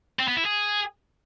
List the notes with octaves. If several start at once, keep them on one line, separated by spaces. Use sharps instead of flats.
C4
B3
E4
G#4